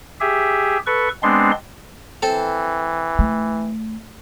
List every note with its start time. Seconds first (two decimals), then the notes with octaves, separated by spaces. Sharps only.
0.21 G4 G#4 E5
0.87 A4 B4 C#6
1.23 G#3 B3 C4 D4 C6
2.22 E3 C4 A4 C5
3.19 A3